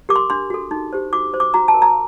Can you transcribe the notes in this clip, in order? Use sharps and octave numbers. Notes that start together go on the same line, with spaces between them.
G4 A#4 D6
C6
D4 C6
F#4 A4
D#4
G4 C5
F#4 D6
C5
D6
F#4 A#5
A5
A#4
A#5